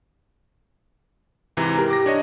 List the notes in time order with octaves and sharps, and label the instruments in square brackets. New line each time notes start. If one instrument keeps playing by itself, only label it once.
[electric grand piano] G#2 C3 E3 [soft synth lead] A#5
[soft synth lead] G4 [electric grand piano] A#4
[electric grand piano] D6 A#6
D4 C#5 D#5